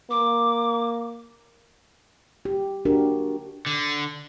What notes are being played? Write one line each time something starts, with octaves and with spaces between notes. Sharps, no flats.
A#3 D6
G4
D4 F#4 G4 A#4
D3